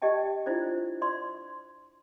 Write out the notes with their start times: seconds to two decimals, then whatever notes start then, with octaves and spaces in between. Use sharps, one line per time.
0.02 G4 D5 D#5 G5 A5
0.46 D4 E4 F4 C5 D5
1.02 D5 C6